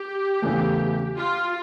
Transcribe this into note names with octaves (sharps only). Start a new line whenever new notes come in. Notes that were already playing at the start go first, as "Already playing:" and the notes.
Already playing: G4
E2 C#3 E3 A3
F4